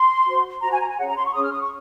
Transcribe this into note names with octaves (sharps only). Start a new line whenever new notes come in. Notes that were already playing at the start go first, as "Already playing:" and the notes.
Already playing: C6
F#4 C5
F#4 C5 A#5
G#5
A#5
G#5
C#4 G#4 C#5 F#5
A#5
C6
C#6
C#4 G#4 C#5 D#6
F6
D#6
C#6